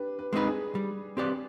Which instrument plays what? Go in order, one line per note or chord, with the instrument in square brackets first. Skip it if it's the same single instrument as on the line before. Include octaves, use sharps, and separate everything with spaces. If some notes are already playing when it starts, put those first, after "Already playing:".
Already playing: [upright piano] D4 G4 B4
B4
[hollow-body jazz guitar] G#3 C4 D#4 B4
[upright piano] G#4
[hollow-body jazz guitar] G3
C4 G4 B4 D5